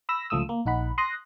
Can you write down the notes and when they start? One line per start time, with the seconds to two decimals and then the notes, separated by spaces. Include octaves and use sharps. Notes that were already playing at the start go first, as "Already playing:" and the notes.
0.09 B5 E6 A#6
0.30 C#2 F3 A3 D#6 E6
0.49 A#3
0.66 A#1 D#4 F#5 B5
0.98 C6 D#6 F#6 A#6